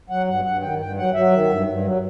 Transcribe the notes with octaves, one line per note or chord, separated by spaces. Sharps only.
F#3 F#5
G2 F#5
G2 F#5
D#3 G5
G2 G5
F#3 F#5
F#3 E5
D#3
G2
G2
F#3